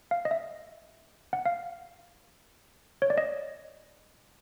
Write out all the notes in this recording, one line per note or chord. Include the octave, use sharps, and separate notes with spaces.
F5
D#5
E5
F#5
F5
C#5
D5
D#5